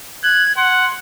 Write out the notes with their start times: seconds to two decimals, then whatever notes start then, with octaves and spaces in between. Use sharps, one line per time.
0.23 F#6 G#6
0.57 F#5 C6